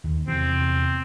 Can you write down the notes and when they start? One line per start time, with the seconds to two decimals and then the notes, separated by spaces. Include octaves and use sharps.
0.04 D#2
0.27 E2 C3 E3 C4